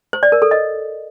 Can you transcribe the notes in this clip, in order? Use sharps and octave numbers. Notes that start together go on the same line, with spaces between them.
C5
D5
A#4
A4
D#5